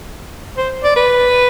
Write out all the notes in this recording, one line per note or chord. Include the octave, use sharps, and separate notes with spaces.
C5
D5
B4